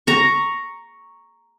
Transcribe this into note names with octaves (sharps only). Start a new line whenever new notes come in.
A#5 C#6